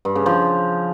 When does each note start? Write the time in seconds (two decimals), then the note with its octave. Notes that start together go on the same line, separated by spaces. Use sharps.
0.05 G2
0.15 C#3
0.26 F3